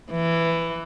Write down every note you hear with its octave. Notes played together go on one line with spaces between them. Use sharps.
E3